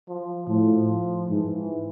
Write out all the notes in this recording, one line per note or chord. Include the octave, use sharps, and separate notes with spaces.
F3
A2 F3
G#2 E3